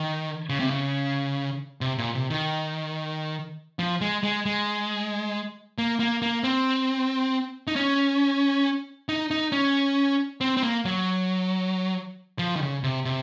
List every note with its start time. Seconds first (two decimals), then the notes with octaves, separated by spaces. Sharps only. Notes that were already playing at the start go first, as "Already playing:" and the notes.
Already playing: D#3
0.49 C#3
0.60 C3
0.70 C#3
1.81 C3
1.98 A#2
2.15 C3
2.30 D#3
3.79 F3
4.01 G#3
4.23 G#3
4.46 G#3
5.78 A#3
6.00 A#3
6.22 A#3
6.44 C4
7.67 D#4
7.76 C#4
9.09 D#4
9.31 D#4
9.52 C#4
10.41 C4
10.57 C4
10.63 A#3
10.85 F#3
12.39 F3
12.56 D#3
12.60 C#3
12.83 C3
13.05 C3